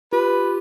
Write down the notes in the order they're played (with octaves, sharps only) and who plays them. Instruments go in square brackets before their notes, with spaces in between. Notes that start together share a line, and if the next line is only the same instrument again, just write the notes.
[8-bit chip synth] F4 G4 [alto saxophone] B4